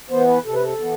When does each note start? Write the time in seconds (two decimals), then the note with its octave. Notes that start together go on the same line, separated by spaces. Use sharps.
0.10 E3 B3 C5
0.28 B4
0.45 C3 A4
0.54 B4
0.63 A4
0.81 E3 B3